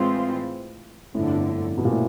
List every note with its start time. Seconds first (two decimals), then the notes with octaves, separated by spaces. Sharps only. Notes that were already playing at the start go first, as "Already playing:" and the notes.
Already playing: A2 E3 G#3 C4 F4
1.14 G1 F2 A2 D3
1.78 B2
1.85 A#2
1.91 A2